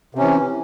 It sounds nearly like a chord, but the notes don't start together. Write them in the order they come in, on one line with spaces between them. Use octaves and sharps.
C3 C#4 E3